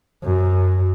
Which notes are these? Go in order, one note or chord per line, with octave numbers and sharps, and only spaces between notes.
F#2